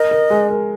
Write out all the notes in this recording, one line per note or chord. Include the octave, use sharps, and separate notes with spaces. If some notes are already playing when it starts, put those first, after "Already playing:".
Already playing: A#4 D#5
A#4
G#3
A#4